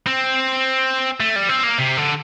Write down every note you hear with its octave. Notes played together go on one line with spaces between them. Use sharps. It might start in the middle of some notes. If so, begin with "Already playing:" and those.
C4
A3
G3
C4
A#3
C3
D3